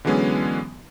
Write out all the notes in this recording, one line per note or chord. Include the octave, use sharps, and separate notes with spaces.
D3 E3 F#3 G#3 B3 C#4